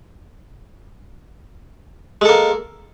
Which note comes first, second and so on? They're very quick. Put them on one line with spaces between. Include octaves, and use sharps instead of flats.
G#3 A4 A#3